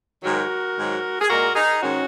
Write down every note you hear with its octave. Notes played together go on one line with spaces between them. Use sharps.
G#2 D#3 F#3 F#4 A#4
G#2 D#3 F#3
G#4
A#2 G#3 F#4 A#4
D#4 G#4
G#2 D#3 G#3 C#4 F#4